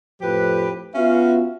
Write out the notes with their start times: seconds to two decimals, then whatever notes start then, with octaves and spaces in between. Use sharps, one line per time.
0.21 F2 A2 F3 G4 B4
0.95 B3 C#4 F4 F#4 E5 F5